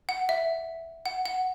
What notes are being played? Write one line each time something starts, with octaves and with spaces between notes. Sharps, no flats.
F#5
E5
F#5
F#5